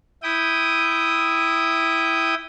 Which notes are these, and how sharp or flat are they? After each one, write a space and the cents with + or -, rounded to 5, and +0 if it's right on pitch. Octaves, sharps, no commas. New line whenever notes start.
E4 +0 G5 -10 D#6 +0